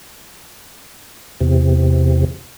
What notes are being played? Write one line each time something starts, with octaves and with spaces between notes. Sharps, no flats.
E2 C3